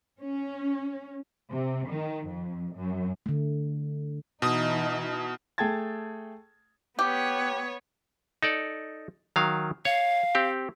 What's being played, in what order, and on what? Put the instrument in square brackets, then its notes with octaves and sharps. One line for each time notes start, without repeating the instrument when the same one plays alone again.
[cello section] C#4
[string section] C3
D#3
F2
F#2
[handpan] D3 A3
[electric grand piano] B2 D#6 [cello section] E3 D#4
[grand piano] A3 G#4 G5 A5 G#6 A6
[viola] B3 C#5 [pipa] G4
[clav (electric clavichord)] D#4 A4 D5
D#3 F#3 F5
[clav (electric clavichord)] C#5 [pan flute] F5
[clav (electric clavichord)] C4 G4